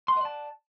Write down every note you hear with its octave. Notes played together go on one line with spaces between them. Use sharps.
D5 D#5 F#5 A5 C6